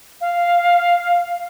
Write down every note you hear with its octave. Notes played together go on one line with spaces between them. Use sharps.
F5